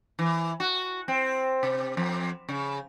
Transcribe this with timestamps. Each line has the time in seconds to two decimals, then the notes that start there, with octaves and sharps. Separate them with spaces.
0.19 E3
0.60 F#4
1.08 C4
1.63 C3
1.97 F2
2.49 C#3